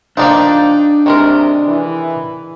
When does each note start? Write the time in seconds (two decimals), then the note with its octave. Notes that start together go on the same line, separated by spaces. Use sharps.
0.17 F3 G3 A#3 D4 D#4 D5 G5
1.06 C3 D#3 G#3 A#4
1.68 E3